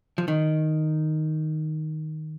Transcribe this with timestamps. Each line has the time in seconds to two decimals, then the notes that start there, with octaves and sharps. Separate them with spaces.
0.18 F3
0.28 D#3